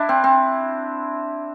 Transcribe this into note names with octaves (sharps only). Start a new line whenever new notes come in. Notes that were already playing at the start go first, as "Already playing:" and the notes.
Already playing: D4 E4
C4
C4